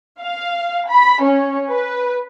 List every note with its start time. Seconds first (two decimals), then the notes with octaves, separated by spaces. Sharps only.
0.20 F5
0.89 B5
1.21 C#4
1.70 B4